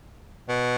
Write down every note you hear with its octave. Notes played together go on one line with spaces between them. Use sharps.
B2